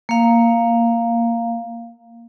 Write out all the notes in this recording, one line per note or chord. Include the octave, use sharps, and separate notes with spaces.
A#3 F5